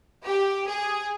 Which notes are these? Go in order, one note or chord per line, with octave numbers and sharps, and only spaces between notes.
G4
G#4